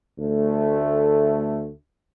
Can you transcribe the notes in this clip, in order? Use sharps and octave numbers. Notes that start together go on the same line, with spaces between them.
D2 A3